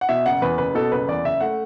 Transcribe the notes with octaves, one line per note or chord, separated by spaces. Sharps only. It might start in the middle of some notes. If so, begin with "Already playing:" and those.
F#5
B2 E5
F#1 F#5
E2 B4
F#1 B4
B2 A4
F#1 B4
E2 D5
F#1 E5
A3 F#5